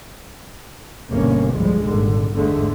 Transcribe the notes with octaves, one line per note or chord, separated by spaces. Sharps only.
G1 C2 G2 B2 A#3 C#4
C#2 A2 F3 G3 G#3
G#1 A#2 D3
G1 E2 G#2 D3 G#3 A3